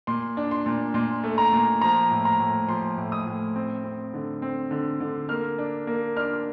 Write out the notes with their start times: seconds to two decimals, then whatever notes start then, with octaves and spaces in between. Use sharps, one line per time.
0.07 A#2 C6
0.37 D4
0.51 C6
0.66 A#2
0.94 A#2 C6
1.24 A3
1.38 A#5
1.53 A#2
1.81 F3 A#5
2.11 A2
2.25 A#5
2.40 A2
2.68 F3 C6
2.98 A2
3.12 D#6
3.27 A2
3.56 C4
3.84 C4
4.14 D3
4.42 C4
4.71 D3
5.00 D3
5.29 A#3 F6
5.58 D4
5.87 A#3
6.17 D4 F6